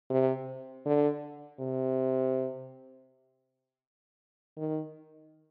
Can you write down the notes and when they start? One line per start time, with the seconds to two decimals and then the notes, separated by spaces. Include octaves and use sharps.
0.10 C3
0.86 D3
1.59 C3
4.58 D#3